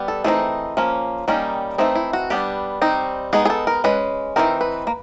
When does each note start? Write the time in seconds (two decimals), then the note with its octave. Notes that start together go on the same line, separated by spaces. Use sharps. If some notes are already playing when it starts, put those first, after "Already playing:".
Already playing: G3 B3
0.08 A4
0.24 E3 A3 C4 D#4 G#4
0.77 F3 A#3 C#4
1.28 D#3 G3 A#3 C#4 D#4
1.78 E3 A3 C4 D#4 E4
1.95 E4
2.13 F#4
2.30 G3 B3 D4 G4
2.82 G3 C4 D#4
3.33 G#3 B3 D#4 G#4
3.45 G#4
3.50 A4
3.67 A#4
3.84 G#3 C#4 B4
4.36 E3 G#3 C4 D#4 A#4
4.61 B4
4.87 A#3